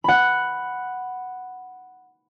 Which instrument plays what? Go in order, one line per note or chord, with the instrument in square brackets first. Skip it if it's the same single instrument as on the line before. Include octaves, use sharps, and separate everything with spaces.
[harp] F#5 B5